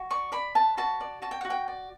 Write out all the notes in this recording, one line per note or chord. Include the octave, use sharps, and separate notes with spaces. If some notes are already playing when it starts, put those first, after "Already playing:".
Already playing: F#4
D5 C#6
D5 B5
B4 A5
F#4 A5
D5
F#4 A5
G5
F#4 F#5
G5
D5